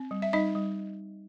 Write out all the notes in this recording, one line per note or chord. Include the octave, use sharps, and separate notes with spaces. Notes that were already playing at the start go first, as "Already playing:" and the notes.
Already playing: C4
G3
E5
G3 D#4 D#5
G3